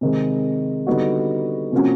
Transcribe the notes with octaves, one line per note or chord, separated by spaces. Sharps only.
C3 D#3 G#3
D3 G3 B3 D#4 F#4
C3 F3 A#3 C#4 F#4